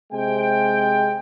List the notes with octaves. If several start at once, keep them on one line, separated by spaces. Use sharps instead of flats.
C3 G#3 G5